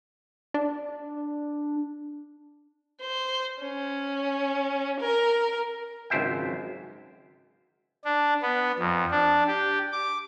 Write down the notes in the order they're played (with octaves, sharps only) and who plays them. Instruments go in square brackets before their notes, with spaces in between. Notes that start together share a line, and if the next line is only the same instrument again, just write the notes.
[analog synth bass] D4
[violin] C5
C#4
A#4
[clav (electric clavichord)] G#1 C#2 F#2 C5 E5 G5
[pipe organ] D4
B3
F2
D4
G4
D6